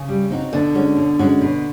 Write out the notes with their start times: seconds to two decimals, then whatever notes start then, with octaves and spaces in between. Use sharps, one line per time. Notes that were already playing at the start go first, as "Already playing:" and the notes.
Already playing: C#3
0.09 G3
0.30 C4 D#4 F#4
0.53 B2 D3
0.74 G#3 C#4 F#4
0.96 B2
1.19 G#3 C#4 F#4
1.41 B2